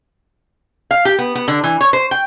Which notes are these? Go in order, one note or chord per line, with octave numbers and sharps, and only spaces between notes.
F5
G4
B3
B3
D3
E3
C#5
C5
G5